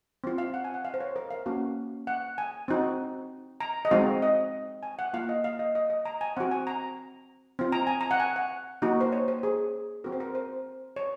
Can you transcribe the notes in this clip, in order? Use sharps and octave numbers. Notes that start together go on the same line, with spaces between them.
C4 F4
F5
F#5
G#5
F#5
F5
C5
C#5
A#4
F5
A#3 C#4 F#4
F#5
G#5
C4 D#4 F#4
A#5
D#5
G#3 C4 D#4 F#4 F5
D#5
G#5
F#5
A#3 F4 F5
D#5
F5
D#5
D#5
D#5
A#5
G#5
C4 F#4 F#5
G#5
A#5
C4 F4
A#5
G#5
A#5
F#5
G#5
F#5
A#3 D#4 F#4
C5
C#5
C5
G#4
C4 F#4 A#4
C5
A#4
C5
C#5